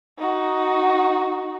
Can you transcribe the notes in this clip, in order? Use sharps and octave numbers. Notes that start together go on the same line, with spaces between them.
D#4 F#4